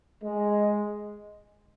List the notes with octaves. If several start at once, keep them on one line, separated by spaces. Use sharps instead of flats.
G#3